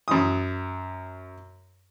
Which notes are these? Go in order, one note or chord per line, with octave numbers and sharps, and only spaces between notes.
F#2 D#6